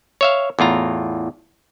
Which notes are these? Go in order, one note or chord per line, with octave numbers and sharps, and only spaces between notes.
C#5 E5 F5
E2 A2 F4 A#5